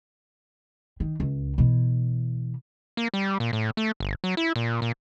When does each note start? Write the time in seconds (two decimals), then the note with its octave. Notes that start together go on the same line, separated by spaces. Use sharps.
1.00 D#3
1.20 C#2
1.58 B2 E3
2.97 A#3
3.14 G3
3.40 A#2
3.53 A2
3.77 A3
4.00 G1
4.24 F#3
4.37 E4
4.56 A#2
4.82 A#2